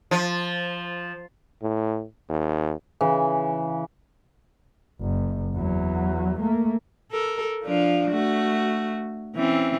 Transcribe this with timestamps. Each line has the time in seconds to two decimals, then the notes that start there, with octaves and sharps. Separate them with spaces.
0.11 F3
1.62 A2
2.29 D#2
3.01 C#3 E3
5.00 F#1
5.54 E2 F#3
6.39 A3 A#3
7.12 A4 A#4
7.63 F3 D4 F4
8.10 A3 F#4
9.36 E3 C4 C#4